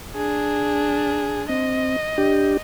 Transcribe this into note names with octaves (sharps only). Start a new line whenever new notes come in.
D4 G#4
C4 D#5
D4 G4